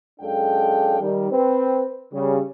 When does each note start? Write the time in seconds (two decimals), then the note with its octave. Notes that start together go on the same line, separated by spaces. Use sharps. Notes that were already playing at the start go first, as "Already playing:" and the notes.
0.21 F#2 G#3 D4 A4 F5 G5
1.01 D#3 G3
1.31 C4 B4
2.12 C#3 G3